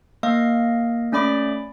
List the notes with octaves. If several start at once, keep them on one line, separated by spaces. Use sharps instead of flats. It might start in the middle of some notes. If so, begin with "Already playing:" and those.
A#3 D#5 F5 C7
A3 C#4 D5 B5 D6